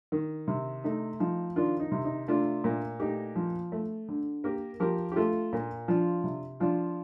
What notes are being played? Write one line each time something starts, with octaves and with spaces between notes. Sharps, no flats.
D#3
C3
A3 D#4
F3 D#4
D#3 D4 F4
D#4
C3
D#4
A3 D4 F4
A#2
A3 D#4 G4
F3
A3
D3
A#3 G4 A#4
F3 G4 A#4
G4
A3 F4 A4
A#2
F3 D4 F4
C3
F3 D4 F4